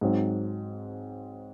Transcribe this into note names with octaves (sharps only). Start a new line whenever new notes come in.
G#2 F#3 C4